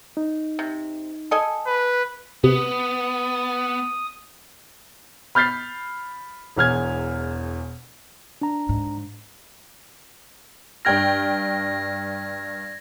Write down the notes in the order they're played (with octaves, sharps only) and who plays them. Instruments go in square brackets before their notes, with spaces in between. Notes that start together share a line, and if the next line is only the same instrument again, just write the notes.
[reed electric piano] D#4
[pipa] C3
A4 D#5 G#5
[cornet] B4
[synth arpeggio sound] C3 [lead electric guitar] B3 [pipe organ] D#6
[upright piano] B5 F6 G6 A6 B6 C7
E1 E2 F6 G#6
[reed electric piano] D4 A#5
[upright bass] G#2
[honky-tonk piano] G2 G5 F6 [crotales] G#6 A#6